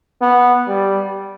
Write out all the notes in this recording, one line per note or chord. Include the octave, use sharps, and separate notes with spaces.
B3
G3